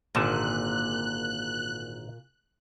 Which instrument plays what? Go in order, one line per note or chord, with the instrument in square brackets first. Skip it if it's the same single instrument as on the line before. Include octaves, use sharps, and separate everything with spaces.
[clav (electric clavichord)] G#1 D3 A5 [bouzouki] A#2 [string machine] F#6